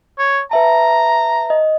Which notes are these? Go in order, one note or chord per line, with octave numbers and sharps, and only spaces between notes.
C#5
B4 E5 A5 A#5
D#5